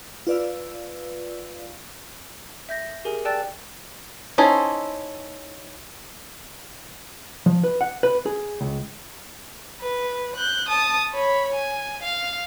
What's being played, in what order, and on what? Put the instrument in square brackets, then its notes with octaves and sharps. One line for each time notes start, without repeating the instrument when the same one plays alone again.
[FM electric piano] F4 B4 D5 F5 E6
[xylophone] E5 G6 A#6
G4 G#4 A#4 G#5
D5 G5 A5 E6 F#6 A6
[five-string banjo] C#4 D#4 E4 A4 C5
[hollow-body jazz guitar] F3
B4
F#5
B4
G#4
C#2
[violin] B4
F#6 G6
A5 D#6
C#5 B5
G#5
F5